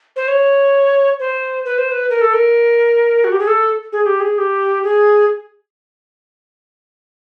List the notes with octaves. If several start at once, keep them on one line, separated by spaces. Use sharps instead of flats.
C5
C#5
C5
B4
C5
B4
A#4
A4
A#4
F#4
G4
G#4
A4
G#4
G4
G#4
G4
G#4